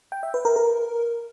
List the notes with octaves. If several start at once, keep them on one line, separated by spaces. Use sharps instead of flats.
G5
E5
B4
A#4
A#4